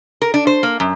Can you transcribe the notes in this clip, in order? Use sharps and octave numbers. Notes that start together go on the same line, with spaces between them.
A#4
D4
C5
A#3
F#2